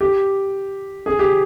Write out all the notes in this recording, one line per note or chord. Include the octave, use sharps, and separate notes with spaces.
G4
G#4
G4